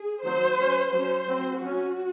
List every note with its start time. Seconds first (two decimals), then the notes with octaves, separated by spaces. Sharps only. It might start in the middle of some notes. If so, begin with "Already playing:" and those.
Already playing: G#4
0.24 D#3 F#3 C4 C5
0.59 F#3 C#4
0.92 F#3 C#4 C5
1.28 F#3 C4
1.62 F#3 C#4 F#4